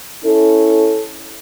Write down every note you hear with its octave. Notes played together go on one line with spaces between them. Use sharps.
C#4 E4 A4